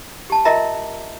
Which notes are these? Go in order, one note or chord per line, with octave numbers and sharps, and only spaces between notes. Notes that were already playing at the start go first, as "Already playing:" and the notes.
G4 A5
F4 A#4 D#5 E5 A#5